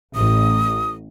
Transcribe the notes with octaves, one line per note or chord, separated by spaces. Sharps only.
A1 D#6